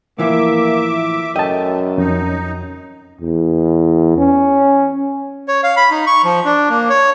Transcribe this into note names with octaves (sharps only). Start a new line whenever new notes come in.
A2 E3 F3 A#3 E5 D6
F#2 A3 D#5 G5 A5
F2 C#4 D#4
E2
C#4
C#5
F5
B5
D#4
C#6
F3
D4
A#3
C#5